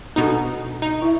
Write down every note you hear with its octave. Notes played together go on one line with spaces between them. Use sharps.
B2 B3 D4 D#4 A4
D#4
E4 E5